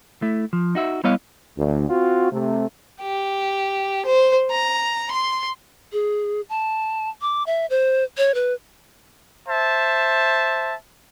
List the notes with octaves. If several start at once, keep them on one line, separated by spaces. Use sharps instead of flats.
A3 E4
F3
D#4 F#4 E5
G3 B3 E4 C#5 D#5 F5
D2
C4 F4 F#4
C3 A3
G4
C5
A#5
C6
G#4
A5
D6
E5
C5
C#5
B4
C5 E5 A5